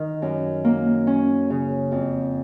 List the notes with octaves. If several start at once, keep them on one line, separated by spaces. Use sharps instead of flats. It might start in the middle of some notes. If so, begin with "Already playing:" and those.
Already playing: D#3
F#2
A#3
C#4
C#3
F2